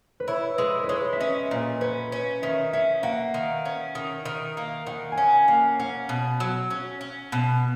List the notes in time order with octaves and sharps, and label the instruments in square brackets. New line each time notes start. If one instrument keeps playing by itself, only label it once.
[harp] B4
[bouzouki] E4 [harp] C#5
[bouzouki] G#3 [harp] B4
[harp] B4
[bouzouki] G#3 [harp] C#5
[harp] E5
[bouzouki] C#4 [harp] D#5
[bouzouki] A#2 [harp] D#5
[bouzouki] C#4 [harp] B4
[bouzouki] C#4
[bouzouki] D#3 [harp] E5
[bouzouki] C#4 [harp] E5
[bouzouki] A#3 [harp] F#5
[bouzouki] D#3
C#4
D#3
D#3
A#3
[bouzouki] D#3 [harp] F#5
[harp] G#5
[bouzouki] C#4 [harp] F#5
[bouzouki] A#3 [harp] F#5
[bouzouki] C#4 [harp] F#5
[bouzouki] B2
F#3
C#4
C#4
B2